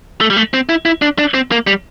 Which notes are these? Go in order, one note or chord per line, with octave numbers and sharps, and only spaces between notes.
A3
G3
A3
C4
E4
E4
D4
D4
C4
A#3
G3